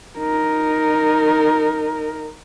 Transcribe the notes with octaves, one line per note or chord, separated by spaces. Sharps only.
D#4 A#4